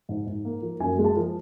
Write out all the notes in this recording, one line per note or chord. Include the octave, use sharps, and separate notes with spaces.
G#2
G#2
A#3
F3
F#2 G#5
G#3
A5
F3